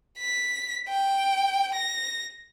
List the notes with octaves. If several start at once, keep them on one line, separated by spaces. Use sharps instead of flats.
B6
G5
A#6